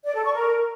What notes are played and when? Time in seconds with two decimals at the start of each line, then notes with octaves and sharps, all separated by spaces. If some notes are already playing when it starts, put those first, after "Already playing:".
0.05 D5
0.15 A4
0.24 C#6
0.34 A#4